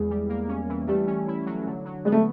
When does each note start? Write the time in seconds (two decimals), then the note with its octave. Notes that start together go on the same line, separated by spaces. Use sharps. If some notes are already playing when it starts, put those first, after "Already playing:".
Already playing: E2 G#3
0.10 G3
0.29 A#3
0.48 C#4
0.69 E3
0.87 G3 A3
1.07 C#4
1.27 E4
1.46 F#3
1.66 D3
1.85 F#3
2.05 G#3 B3
2.12 A3